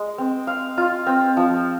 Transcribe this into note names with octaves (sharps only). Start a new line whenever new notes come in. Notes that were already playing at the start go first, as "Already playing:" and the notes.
Already playing: G#3
C4
F5
F4
C4
F3